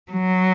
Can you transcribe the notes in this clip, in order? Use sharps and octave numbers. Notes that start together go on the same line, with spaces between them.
F#3